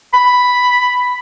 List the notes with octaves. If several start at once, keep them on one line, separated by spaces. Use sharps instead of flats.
B5